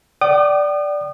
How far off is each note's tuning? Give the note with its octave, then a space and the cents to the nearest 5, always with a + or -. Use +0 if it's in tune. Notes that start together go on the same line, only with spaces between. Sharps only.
D5 +0 G5 -40 D#6 -40